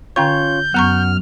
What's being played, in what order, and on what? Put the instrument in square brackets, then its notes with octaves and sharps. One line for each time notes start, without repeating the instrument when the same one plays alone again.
[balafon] D3 G5 C#6 [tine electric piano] C#4 F4 C#5 [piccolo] G6
[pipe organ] F#2 F6 [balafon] B3 A#5 C#6 [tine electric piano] F#5